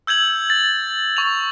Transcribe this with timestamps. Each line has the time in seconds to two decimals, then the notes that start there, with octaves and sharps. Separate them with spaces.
0.07 E6 G6 G#6 F#7
0.50 A6
1.17 C#6 F7